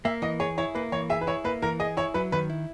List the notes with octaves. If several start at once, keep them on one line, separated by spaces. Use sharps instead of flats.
A#3 E5
E3 D#5
G#4 C#5
E4 C#5
A#3 B4
E3 C#5
G#4 E5
B4
E4 C#5
A#3 B4
E3 A#4
G#4 D#5
E4 C#5
F#3 B4
D#3 B4
E4